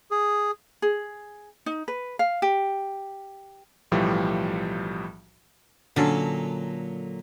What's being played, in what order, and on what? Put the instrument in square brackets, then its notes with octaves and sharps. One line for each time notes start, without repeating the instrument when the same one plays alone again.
[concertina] G#4
[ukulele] G#4
D#4
B4
F5
G4
[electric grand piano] B1 A2 E3 F3 G3
[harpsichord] A#2 F#3 A4 [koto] D3 C#4